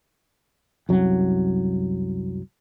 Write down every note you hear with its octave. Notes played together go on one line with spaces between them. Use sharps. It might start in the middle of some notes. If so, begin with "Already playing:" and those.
C2 F#2 F#3